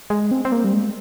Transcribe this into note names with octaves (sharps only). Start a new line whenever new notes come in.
G#3
C4
C4
A#3
G3
G#3